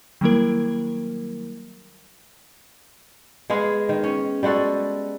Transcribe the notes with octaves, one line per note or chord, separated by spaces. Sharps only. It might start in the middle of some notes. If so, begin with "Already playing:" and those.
D#3 F#3 G3 A#3 E4 A#4
G#3 B3 G#4 F5
D#3
C#4
G3 G#3 F#4 A4